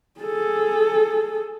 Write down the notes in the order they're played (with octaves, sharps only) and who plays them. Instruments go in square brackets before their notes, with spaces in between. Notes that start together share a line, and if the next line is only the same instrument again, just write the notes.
[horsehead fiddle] G#4 A4